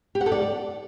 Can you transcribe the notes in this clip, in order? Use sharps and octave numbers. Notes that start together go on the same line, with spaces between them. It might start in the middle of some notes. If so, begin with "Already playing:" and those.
G4
F#5
A4
D5